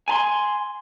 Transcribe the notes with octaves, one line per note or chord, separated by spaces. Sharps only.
G#5 A5 C6